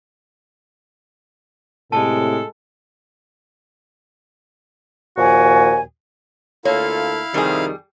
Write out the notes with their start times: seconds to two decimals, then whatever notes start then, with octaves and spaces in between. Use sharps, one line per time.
1.92 A2 C3 G#3 A4 A5
5.17 D#2 A#2 F3 F#4 G#5
6.65 D2 A#3 E4 F4 A4 C#5 F5
7.34 F2 C3 D#3 G3 G#4